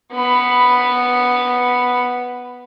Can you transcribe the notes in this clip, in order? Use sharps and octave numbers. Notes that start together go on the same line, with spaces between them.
B3 B5